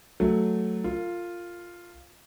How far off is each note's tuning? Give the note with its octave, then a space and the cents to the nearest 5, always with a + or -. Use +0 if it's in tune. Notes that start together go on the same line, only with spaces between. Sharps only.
F#3 +0 A3 +0
F4 +0 A#4 -40